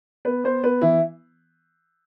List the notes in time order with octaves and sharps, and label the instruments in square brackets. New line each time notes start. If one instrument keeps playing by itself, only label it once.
[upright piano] B3 B4
B3 C5
B3 B4
E3 E4